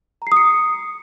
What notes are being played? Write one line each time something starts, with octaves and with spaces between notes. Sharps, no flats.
A#5 D#6 C7 C#7